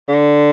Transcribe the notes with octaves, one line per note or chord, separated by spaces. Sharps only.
D3